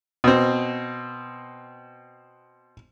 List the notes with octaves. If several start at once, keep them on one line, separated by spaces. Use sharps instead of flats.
B2 C4